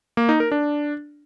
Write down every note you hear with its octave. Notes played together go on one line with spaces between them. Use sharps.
A#3
D#4
A#4
D4